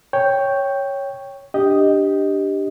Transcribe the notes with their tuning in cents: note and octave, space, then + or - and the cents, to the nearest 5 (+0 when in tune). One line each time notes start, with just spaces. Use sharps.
C#5 +0 G5 +0
D4 +0 G4 +0 D#5 +0